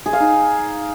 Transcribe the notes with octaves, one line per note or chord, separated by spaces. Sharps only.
G#4
F5
D#4